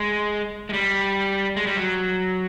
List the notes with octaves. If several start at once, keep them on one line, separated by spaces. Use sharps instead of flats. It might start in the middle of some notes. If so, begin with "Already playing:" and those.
Already playing: G#3
G#3
G3
G#3
G3
F#3